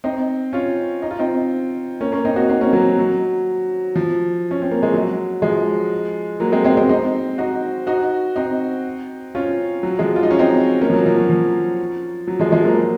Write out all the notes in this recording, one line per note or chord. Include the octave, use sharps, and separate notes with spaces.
C4 D#4
C#4 F4
D#4
F4
C4 D#4
A#3 C#4
A#3 C#4
C4 D#4
D#4 F#4
C4 D#4
A#3 C#4
F#3 A#3
F#3
F3
C#4
C4
A#3
G#3
F#3
F3 G#3
F#3 A#3
G#3 C4
G#3 C4
G#3 C4
C4 D#4
D#4 F#4
D#4 F#4
C4 D#4
C#4 F4
F#3
F3 G#3
F4
D#4
C#4
C4 D#4
A#3 C#4
F3
F#3
F3
F#3
F3
F#3
F3 G#3
F3 G#3
F#3 A#3